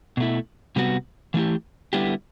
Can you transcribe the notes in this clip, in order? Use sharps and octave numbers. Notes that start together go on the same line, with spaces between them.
B2 A3 E4
C3 G3 B3 F#4
E3 A3 E4 G4
D3 G3 B3 E4 G4